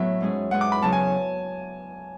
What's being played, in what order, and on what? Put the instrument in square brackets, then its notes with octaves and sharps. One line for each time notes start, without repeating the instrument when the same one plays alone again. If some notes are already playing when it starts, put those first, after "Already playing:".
Already playing: [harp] A2 F#3 B3 [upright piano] E5
[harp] G#2 G#3 C#4 G#4
[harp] G#2 G#3 C#4 G#4 [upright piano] F#5
[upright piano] D6
B5
[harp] E2 C#3 F#3 C#4 G#4 [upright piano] A5
[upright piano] G#5